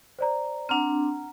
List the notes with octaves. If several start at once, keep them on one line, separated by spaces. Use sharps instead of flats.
C5 D5 A#5
C4 D4 F#5 A#5 F6